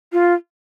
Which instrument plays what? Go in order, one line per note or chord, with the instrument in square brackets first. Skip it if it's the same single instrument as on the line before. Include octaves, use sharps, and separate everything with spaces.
[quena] F4